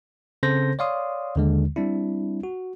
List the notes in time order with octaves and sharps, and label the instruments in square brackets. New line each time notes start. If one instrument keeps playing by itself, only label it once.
[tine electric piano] C#3 C4 A4 C5 G6 A#6
C#5 D5 F5 C6 D#6
D#2 D3 G#3
G3 C4 D4 E4
F#4